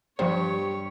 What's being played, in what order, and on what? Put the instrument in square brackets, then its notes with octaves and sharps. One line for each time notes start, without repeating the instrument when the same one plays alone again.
[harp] G2 C#6 [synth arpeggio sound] F3 C5 [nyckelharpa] G4 C#5